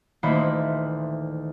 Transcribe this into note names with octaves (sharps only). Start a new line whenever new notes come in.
D2 A#2 D#3 E3 C5 B5